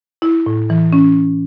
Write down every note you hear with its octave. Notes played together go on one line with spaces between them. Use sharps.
E4
A2
E3
C#4